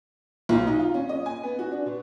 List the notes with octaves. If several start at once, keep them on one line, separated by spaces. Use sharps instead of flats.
B1
D#4
F4
C#4
D#5
G#5
B3
F#4
D4
B2